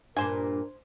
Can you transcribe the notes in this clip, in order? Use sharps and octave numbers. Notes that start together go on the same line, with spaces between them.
G2 A#2 D4 A#4 C5 G#5